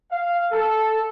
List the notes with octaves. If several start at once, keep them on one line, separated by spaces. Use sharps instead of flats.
F5
A4